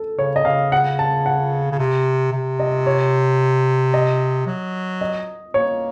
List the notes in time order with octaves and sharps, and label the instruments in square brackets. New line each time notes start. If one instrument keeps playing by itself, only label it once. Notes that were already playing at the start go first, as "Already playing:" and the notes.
Already playing: [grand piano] A4
[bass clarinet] C#3 [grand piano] C#5
[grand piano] D#5
[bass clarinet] C#3 [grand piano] F5
[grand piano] F#5
A5
F#5
[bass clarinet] C#3
C3
C3
[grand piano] D#5
C#5
D#5
[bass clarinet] F#3
[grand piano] D#5
[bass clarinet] A#3 [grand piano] C#5